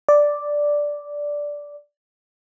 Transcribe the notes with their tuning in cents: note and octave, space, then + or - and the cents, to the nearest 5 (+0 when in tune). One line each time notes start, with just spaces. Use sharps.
D5 -5